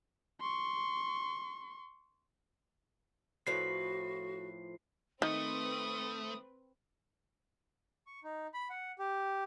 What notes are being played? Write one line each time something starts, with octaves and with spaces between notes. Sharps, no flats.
C6 C#6
A2 F3 F#4 B4 C7
D#3 A3 C4 B4 D#6
C#6
D#4
B5
F#5
G4